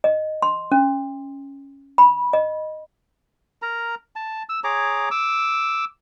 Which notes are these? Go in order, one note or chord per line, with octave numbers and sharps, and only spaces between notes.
D#5
C6
C#4
B5
D#5
A#4 A#5
A5
E6
G#4 C#5 A#5 D6
D6 E6